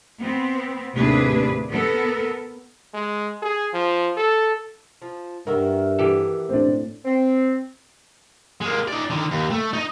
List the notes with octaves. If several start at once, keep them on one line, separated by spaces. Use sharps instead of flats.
B3 C4
D#2 A2 C3 D4 G#4 B4
B3 A4 A#4
G#3
G#4
F3
A4
F3
G2 D#3 F#4 A#4 E5
E3 G4 A4
A2 C4 D4
C4
G#3 A#3
D#4 D5
D3 D#3
D#2
A3
D#4 D#5